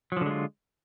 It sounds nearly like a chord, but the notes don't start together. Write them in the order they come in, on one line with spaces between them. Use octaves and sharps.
F#3 F3 D3 G#3 F4